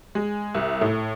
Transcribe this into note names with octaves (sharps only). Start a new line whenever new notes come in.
G#3
C2
A2